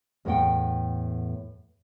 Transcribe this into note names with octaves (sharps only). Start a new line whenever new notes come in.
E2 A2 A3 C#5 F#5 G5